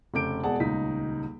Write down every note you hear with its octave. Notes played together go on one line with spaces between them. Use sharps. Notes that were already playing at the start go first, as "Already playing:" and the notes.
F1 C#3 A4 D6 G6 D7
E1 G#4 D5 F#5 A5
D#1 C#2 D#4 B6